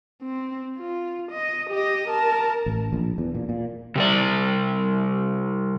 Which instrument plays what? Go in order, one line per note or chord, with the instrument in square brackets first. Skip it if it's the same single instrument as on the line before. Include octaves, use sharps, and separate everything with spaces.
[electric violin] C4
F4
D#5
G4 D#5
A#4 A5
[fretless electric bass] A1
A#1
E2
A#2
A#2
[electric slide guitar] C3 G3 D5